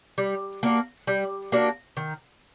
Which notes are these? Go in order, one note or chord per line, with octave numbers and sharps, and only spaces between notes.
G3
A#3 D4 F#4
G3
A#3 D4 F#4
D#3